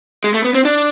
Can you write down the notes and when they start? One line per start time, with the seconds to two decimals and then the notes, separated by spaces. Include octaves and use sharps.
0.24 G#3
0.34 A3
0.44 B3
0.55 C4
0.65 D4